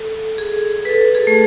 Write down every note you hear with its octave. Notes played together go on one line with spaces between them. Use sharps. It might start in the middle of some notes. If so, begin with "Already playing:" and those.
Already playing: A4
G#4
B4
A4
A4
G#4
A3